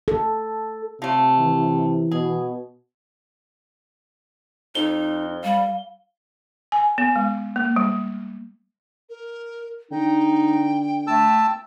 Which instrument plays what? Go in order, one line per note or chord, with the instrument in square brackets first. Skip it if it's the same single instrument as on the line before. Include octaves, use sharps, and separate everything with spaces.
[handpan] A4
[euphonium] C3 [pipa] F3 A3
[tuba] E3
[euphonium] B2 [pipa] G#4
[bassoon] F2 [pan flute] D#4 [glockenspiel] G7
[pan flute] G3 [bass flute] F5
[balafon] G#5
B3
G#3
A#3
G3
[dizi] A#4
[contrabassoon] D3 [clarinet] D#4 [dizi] G5
[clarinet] A3 [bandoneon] A5 E6